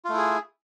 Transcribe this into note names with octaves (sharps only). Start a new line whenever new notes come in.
A3 E4 F4 G#4